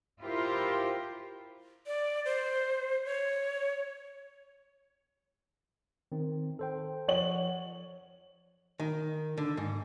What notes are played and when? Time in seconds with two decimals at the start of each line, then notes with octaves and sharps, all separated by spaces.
0.20 E4 F4 G4 A#4 C5
1.87 D5
2.25 C5
3.05 C#5
6.12 D#3 C4
6.59 A4 C5 G5
7.08 F3 C#5 F#5 F#7
8.80 D#3
9.37 D3
9.57 G#2